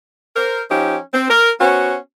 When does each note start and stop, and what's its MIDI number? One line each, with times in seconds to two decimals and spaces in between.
0.36 0.62 70
0.36 0.62 72
0.71 0.97 53
0.71 0.97 61
0.71 0.97 63
0.71 0.97 67
1.14 1.27 60
1.29 1.50 70
1.60 1.97 59
1.60 1.97 61
1.60 1.97 66
1.60 1.97 72